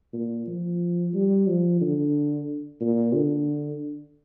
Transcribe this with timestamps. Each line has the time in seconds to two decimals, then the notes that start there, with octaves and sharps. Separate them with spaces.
0.13 A#2
0.47 F3
1.14 G3
1.47 F3
1.81 D3
2.81 A#2
3.14 D3